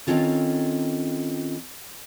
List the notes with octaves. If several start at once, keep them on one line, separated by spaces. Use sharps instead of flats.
D#3 F#3 C4 C#4 F4 A4